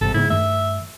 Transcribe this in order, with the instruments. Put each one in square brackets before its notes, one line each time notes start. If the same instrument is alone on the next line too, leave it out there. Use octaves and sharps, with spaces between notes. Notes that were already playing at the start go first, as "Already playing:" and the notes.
[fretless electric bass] G#1 G2 C3 [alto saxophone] A4
[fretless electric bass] G#2 C#3 B3 [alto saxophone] E4
[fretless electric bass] G2 D#3 A3 [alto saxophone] E5